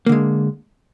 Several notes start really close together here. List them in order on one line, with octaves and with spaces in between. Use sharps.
A#3 D3 G#3